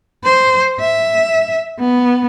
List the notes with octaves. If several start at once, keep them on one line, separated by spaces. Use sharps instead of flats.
C5
E5
B3